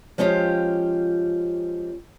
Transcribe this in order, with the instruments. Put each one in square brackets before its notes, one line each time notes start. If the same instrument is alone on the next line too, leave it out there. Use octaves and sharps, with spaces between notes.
[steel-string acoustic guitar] F3 G#3 C#4 F4 G4